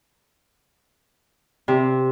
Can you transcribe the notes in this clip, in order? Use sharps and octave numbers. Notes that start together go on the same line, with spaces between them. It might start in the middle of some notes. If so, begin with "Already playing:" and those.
C3